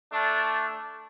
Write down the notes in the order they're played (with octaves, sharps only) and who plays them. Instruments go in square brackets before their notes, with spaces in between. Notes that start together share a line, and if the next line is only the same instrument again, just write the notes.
[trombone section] A3 D4